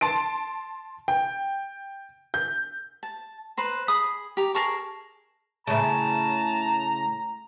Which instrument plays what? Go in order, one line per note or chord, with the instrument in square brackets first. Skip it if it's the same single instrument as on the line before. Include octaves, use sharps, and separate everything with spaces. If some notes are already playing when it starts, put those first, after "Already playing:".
[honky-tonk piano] A5 C6 D7
G5
G6
[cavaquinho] A5
B4 C5 A#5
G#4 B5 D#6
G4 A#5
G#4 A#4 A5 C#6
[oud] A2 C#3 [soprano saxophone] A5 [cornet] A#5